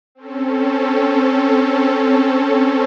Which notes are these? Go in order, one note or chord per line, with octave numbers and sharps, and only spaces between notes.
C4 C#4 A4